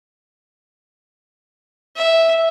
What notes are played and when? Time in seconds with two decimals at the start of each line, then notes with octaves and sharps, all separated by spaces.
1.96 E5